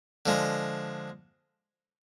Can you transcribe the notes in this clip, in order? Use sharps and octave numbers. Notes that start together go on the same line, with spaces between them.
D3 F3 G#3